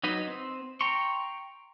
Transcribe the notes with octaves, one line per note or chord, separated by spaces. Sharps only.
F#3 D#4 B4 D#5
C4
G5 A#5 C6 C#6